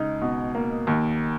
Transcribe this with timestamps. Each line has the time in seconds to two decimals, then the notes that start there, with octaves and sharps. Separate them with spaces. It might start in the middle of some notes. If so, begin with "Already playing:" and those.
Already playing: C#2 D#4
0.21 B2
0.55 A#3
0.87 D#2